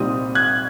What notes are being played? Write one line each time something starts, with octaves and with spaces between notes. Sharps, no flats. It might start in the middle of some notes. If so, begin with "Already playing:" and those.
Already playing: C2 A#2 G3 C4 D#4 D#6
F#6 G#6